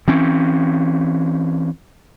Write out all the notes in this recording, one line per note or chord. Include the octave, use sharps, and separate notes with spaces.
E3 C4 C#4